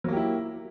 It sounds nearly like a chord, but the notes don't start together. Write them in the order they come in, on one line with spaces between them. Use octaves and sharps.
F#3 A#3 G4 E4